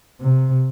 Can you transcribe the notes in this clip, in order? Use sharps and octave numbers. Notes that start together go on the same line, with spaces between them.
C3